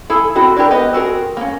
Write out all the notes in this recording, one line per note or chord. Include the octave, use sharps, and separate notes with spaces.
E4 G#4 A4
C4 E4 F#4 A4 B5
D4 E4 F#4 G4 A#4
B3 G4 B4 D#5
C4 F#4 G#4 A#4
A#3 C#4